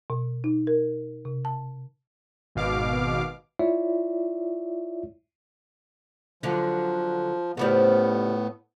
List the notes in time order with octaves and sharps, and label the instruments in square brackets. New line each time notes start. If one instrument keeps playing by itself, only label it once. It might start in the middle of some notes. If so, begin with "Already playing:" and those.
[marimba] B2
D#4
A#4
C3
A5
[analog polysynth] G#1 B2 F5 D6
[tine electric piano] E4 F4 C#5 D5 E5
[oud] D3 F#3 [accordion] F3
[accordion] A2 B3 [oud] C#3 F3 G3